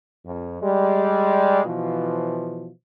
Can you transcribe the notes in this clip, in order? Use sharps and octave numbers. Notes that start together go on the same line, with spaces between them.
F2
G3 G#3
B2 E3 F3